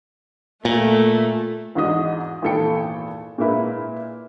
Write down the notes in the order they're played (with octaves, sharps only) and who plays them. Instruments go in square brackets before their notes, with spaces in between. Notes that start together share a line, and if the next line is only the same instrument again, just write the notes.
[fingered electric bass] A#2 [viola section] A3
[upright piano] E2 G#2 D#4 F#4 D#5 D#6
G#1 E2 A#2 A4 G5 C#7
A#2 G#3 A#3 E4 B4